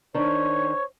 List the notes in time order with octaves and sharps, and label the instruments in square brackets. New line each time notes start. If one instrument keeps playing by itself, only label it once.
[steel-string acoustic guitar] D#3 D4 [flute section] C5 C#5 C#6